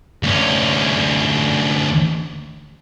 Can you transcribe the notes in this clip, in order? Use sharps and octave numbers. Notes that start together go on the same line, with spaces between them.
D2 C#4